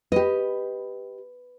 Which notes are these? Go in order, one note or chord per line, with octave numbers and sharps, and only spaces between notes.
G4 B4 D#5